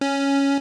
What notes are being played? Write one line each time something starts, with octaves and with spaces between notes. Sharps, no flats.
C#4